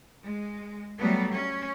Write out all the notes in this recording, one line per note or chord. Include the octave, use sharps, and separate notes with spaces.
G#3
F#3 G3 A3 B3
C#4